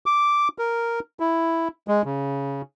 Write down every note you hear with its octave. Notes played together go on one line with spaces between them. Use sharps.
D6
A#4
E4
G#3
C#3